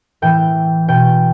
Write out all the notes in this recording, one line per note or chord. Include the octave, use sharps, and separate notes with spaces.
A2 E3 G5
B2 G5